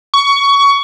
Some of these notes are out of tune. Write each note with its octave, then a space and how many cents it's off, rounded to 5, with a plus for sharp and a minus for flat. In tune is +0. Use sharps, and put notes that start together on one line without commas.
C#6 +20